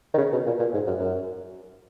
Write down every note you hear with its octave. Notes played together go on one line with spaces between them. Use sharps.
D#3
C#3
B2
A#2
A#2
G#2
F#2
F#2